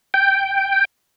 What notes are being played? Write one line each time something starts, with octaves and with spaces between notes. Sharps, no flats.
G5